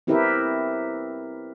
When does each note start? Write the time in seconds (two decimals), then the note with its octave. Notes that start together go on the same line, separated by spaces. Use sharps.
0.07 C4 E4 G4 A#4 B4 E5